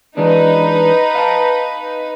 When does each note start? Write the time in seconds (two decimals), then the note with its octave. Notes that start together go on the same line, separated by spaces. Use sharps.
0.17 E3 G#3 D4 D#4 B4
1.15 F5 A5